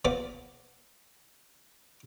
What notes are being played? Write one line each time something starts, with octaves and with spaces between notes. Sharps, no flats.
F3 B3 D5 G5 D6